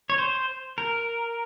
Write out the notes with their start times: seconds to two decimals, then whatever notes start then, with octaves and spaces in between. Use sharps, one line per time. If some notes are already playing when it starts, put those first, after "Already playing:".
0.10 C#5
0.18 C5
0.78 A#4